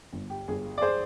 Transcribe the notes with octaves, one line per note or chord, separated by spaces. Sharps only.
G1
G4
G1 G#4
D5
G#4 C5